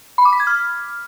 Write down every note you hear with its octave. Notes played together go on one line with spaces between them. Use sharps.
B5
D6
B6
G#6
F6